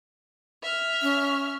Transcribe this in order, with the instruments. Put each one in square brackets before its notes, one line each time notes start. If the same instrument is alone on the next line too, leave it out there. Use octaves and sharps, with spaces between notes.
[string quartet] E5 F6
[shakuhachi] C#4